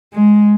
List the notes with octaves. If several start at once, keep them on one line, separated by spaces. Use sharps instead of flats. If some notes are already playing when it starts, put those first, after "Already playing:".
G#3